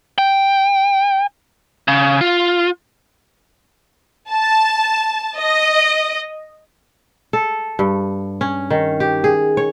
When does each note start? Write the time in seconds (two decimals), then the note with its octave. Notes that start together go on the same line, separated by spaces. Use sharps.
0.18 G5
1.88 C#3
2.21 F4
4.31 A5
5.38 D#5
7.33 A4
7.79 G2
8.41 C#4
8.70 D#3
9.00 G4
9.24 G#4
9.57 C#5